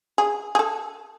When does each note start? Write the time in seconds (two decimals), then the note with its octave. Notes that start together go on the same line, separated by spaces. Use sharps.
0.18 G#4
0.55 G#4
0.59 A4